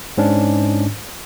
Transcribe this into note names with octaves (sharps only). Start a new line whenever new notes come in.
G#2 C#4 D4